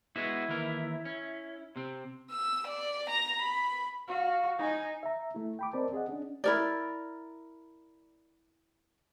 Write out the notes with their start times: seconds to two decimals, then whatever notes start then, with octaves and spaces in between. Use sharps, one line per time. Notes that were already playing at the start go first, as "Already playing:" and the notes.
0.16 G#3 B3 E4 F#4
0.48 D#2 E3 A#4
1.05 C#4
1.76 C3 C4
2.31 E6
2.67 D5
3.09 A#5
3.41 B5
4.07 F#4 F5
4.59 D#4 G#5
5.03 E5 A#5
5.35 A3 E4
5.59 G5 B5 D6
5.73 C4 A#4 C5 D5 D#5 A5
5.93 G#4 D#5 F#5
6.09 C#4 D4
6.44 E4 A#4 D5